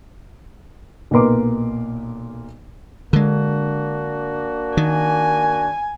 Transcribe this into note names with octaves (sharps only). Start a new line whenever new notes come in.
B1 A#2 B3 A#4 C6 D6
D3 G#3 A#3 D4 F#4
D#3 G#5